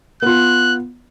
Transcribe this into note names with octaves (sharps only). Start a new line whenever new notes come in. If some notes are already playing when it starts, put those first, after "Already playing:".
B3 F4 F#6